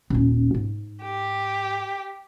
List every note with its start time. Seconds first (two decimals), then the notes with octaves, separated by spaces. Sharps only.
0.10 D#1 C#4
0.54 G#2
1.03 G4